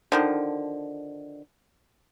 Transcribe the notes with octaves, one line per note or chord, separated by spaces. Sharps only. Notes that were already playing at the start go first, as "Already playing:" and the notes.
D3 D#3 F3